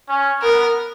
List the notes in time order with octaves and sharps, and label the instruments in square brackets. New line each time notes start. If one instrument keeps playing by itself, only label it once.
[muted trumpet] C#4
[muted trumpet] B3 [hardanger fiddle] A#4